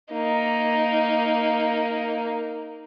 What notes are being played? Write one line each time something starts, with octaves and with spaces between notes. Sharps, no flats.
A#3 D#4